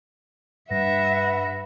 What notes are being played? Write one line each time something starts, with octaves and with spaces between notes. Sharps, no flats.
G2 B4 E5 F#5 A#6